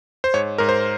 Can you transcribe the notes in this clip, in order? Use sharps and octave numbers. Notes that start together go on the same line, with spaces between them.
C5
G#2 C#5
G#2 A#4
C5